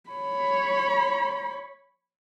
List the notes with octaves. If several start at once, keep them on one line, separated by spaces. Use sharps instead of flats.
C#5 B5